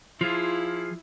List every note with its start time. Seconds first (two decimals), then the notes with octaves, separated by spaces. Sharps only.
0.21 F3 E4 F4 G#4